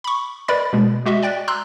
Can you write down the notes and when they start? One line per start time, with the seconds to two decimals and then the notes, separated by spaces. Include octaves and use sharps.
0.04 B5 C#6
0.48 A#4 B4 D5 D#5 B5 A6
0.73 B2 G#3
1.06 G#3 F#4 D#5 E5
1.22 D5 G5 F#6 A6
1.48 A#5 C6 E6 F#6